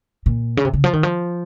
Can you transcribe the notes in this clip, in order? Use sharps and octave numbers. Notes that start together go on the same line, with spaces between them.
A#2
C#3
C3
C#3
F3
D#3
F3